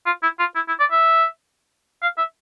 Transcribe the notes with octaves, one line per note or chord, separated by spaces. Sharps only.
F4
E4
F4
E4
E4
D5
E5
F5
E5